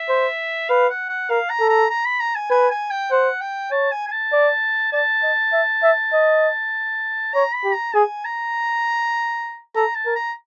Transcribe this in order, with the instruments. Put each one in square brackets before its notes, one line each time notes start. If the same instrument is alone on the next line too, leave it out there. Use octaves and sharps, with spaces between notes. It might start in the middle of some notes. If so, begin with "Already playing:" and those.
Already playing: [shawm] E5
[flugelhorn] C5
[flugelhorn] B4 [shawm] F5
[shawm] F#5
F#5
[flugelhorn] A#4 [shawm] F5
[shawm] A#5
[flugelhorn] A4
[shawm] A#5
A#5
B5
A#5
G#5
[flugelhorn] B4 [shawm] G#5
[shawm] G#5
G5
[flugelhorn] C5 [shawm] F#5
[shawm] G5
[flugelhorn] C#5 [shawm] A5
[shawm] G#5
G#5
A5
[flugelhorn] D5
[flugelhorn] D5 [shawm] A5
[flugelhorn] D#5
E5
E5
D#5
[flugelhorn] C#5 [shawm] A#5
[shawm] B5
[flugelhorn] G4
[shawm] A#5
[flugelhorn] G#4 [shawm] G#5
[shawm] A#5
[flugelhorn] A4 [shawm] A#5
[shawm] A5
[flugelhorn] A#4
[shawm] A#5